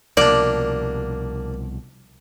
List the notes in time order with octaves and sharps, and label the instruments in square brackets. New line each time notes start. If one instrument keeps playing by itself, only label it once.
[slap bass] C2 B2 F3 [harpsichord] A#3 D4 [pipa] D5